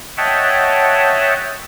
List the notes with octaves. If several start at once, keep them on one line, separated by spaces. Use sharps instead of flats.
C#5 D#5 E5 F#5 G5 A5